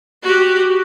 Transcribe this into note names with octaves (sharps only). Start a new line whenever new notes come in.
F#4 G4